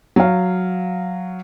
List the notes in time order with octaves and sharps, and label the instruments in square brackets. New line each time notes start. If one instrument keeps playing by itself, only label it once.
[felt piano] F#3 F5